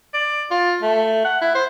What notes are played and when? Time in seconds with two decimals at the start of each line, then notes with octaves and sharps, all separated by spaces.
0.14 D5
0.51 F4
0.82 A3
1.25 F#5
1.41 E4
1.55 C5